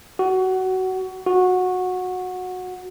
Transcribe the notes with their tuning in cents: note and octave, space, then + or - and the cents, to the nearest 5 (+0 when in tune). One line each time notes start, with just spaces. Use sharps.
F#4 +20
F#4 -15